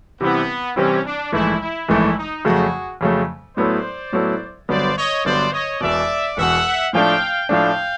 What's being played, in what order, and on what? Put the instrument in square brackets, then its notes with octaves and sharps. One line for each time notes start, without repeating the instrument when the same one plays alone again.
[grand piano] C3 E3 G3 C4 E4 [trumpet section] B3
[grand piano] C3 E3 G3 C4 E4 [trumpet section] C#4
[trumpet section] D4
[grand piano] A#1 G#2 E3 A3 [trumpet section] E4
[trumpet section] E4
[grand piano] A#1 G#2 E3 A3 [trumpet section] E4
[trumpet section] D#4
[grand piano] F2 C#3 F#3 A3 [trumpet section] F#4 G#4
[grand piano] F2 C#3 F#3 A3
[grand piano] A2 F#3 B3 E4 A4 [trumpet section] C5 D5
[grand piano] A2 F#3 B3 E4 A4
[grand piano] G1 G2 D3 F#3 B3 [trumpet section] C5 D5
[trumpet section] C#5 D#5
[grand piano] G1 G2 D3 F#3 B3 [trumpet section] C5 D5
[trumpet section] C#5 D#5
[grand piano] E1 E2 B2 [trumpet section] D5 E5
[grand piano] E1 E2 B2 [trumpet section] E5 F#5
[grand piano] A2 F3 A3 D4 [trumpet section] F5 G5
[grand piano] A2 F3 A3 D4 [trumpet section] F5 G5